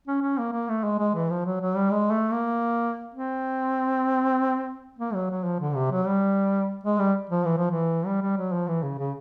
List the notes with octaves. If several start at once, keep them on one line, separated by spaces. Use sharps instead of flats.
C#4
C#4
A#3
A#3
A3
G#3
G#3
E3
F3
F#3
F#3
G3
G#3
A3
A#3
C4
A#3
F#3
F#3
F3
D3
C3
F#3
G3
G#3
G3
F3
E3
F3
E3
G3
G3
F#3
F3
E3
C#3
C#3